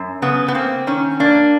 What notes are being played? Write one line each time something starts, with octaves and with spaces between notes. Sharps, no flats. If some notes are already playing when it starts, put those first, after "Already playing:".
Already playing: F#2
C#3 B3
B3
A#3 C4
D#3 C#4
A#3 D4